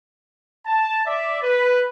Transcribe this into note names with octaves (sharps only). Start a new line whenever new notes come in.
A5
D5 E5
B4